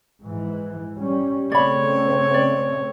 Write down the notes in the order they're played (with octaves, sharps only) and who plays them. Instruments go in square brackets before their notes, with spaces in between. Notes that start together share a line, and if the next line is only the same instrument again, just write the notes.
[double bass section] G#2 E3
G3 C#4
[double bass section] C#3 A3 C4 [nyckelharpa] C#5 [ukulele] D5 B5
[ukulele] D5